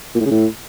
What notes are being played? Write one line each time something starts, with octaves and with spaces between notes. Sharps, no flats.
A#2
A2
C#3
A2